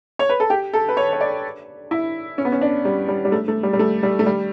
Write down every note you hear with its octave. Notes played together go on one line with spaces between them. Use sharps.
C#5
B4
A4
G4
A4
B4
C#5
C#5
D5
E4
C#4
B3
C#4
D4
G3
G3
G3
A3
A3
G3
G3
A3
G3
A3
G3